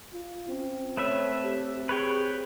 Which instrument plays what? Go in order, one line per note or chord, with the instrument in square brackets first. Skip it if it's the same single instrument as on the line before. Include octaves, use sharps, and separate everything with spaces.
[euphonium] F4
[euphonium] C4 [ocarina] C#4
[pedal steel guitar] A3 B4 E5 [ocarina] C#5
[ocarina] G4
[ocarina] G#4 [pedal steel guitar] B4 C#5 G5